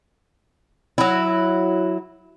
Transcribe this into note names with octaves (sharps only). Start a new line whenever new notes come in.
F#3 E4